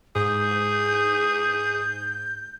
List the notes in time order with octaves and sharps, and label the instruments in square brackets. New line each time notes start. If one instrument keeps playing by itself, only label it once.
[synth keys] G#2 [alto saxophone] G#4 [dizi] G6